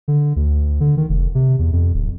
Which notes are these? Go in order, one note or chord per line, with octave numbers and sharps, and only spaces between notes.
D3
D2
D3
D#3
F1
C3
E2
F2
D1